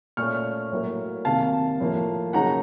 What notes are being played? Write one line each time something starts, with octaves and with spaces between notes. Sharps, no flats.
A#2 A3 C#4 C#6 F6
A2 F#3 A#3
C3 D#3 A#3 F5 A5
A2 F3 A#3
C#3 F#3 A#3 D#4 F#5 A#5